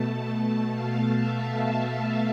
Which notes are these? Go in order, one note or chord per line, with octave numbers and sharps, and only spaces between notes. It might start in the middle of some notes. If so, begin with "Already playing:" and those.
Already playing: B2 A3 A5
F5
E5
E5
F5